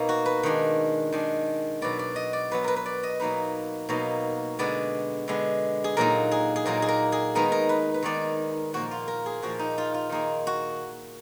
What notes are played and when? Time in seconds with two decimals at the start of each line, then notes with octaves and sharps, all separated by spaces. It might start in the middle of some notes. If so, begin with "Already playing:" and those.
Already playing: B2 A#3 D#4
0.09 F#4
0.26 B4
0.43 D#3 G#3 D4
1.12 D#3 G#3 D4
1.81 B2 F#3 B3 D5
1.99 D5
2.16 D#5
2.33 D5
2.51 B2 F#3 B3 B4
2.64 A#4 B4
2.76 B4
2.86 D5
3.03 D#5
3.19 B2 F#3 A#3 D#4 B4
3.89 B2 F#3 A#3 D#4
4.59 D3 G#3 B3 D5
5.28 D3 G#3 B3
5.84 G#4
5.97 A#2 F#3 A#3 D#4 A#4
6.31 G#4
6.56 G#4
6.66 A#2 F#3 A#3 D#4 A#4
6.82 G#4
6.88 A#4
7.12 G#4
7.35 D#3 G#3 B3 D#4 A#4
7.52 A#4
7.69 B4
7.94 B4
8.02 D#3 G#3 B3 D#4 D5
8.73 A#2 F3 A#3 F#4
8.91 F4
9.08 A#4
9.26 G#4
9.42 A#2 F3 A#3 F#4
9.59 D#4
9.78 F4
9.94 F4
10.09 D#3 A#3 D#4 G#4
10.47 F#4